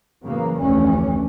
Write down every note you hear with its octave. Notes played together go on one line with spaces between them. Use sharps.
C#3 E3 F#3 A#3
F1 D2 E3 A3 C#4